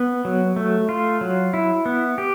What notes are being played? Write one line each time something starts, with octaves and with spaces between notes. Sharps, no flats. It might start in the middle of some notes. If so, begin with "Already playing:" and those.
Already playing: B3
F#3
A3
F4
F#3
E4
B3
G4